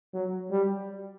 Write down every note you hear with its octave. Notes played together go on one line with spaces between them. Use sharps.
F#3
G3